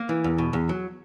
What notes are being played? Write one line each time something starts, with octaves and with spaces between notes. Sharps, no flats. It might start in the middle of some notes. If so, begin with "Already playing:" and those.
Already playing: A#3
E3
E2
B2
E2
F#3